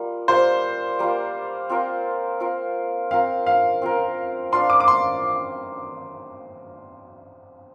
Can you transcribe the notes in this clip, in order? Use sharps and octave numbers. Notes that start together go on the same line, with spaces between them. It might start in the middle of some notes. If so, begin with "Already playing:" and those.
Already playing: G3 A#3 F4
G3 A#3 F4 C5
G3 A#3 F4
C4 F4 A#4
C4 F4 A#4
C4 F4 A#4 F5
F5
C4 F4 A#4
D4 F4 D5 F5 C6
D6
D6
C6